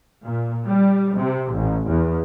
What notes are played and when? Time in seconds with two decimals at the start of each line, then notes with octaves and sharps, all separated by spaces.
0.22 A#2
0.66 G3
1.17 C3
1.53 A1
1.90 E2